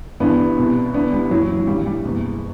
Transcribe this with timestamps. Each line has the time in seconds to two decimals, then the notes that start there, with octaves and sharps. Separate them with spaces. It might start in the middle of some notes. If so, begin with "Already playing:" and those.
0.20 G1 G2 E3 B3 D4
0.57 C2 B2
0.94 D2 D3 B3 D4
1.12 G3
1.30 F#1 F#2 E3 F#3
1.59 F#3
1.67 A1 G2 E3 G3
1.86 G3
2.04 F#1 E2 B2